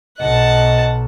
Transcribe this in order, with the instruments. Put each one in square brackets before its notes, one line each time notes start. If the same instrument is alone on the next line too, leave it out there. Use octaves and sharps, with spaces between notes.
[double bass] B1 [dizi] D#5 [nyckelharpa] F#5 A5